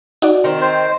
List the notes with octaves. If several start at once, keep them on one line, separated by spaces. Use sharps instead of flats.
D#4 F#4 D5
D#3 C4
C5